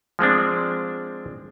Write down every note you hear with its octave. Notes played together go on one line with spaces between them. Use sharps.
F3 G#3 C4 D4